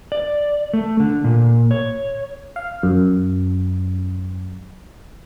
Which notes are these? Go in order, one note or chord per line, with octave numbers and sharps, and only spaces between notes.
D5
A3
D3
A#2
C#5
F5
F#2